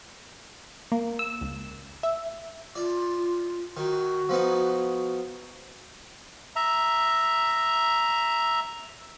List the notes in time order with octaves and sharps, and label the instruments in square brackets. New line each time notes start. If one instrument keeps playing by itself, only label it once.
[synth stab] A#3
E6
C#2
E5
[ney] F4 [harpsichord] D5
[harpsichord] D#3 [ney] F#4
[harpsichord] F3 B3 D#4
[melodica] E5 A#5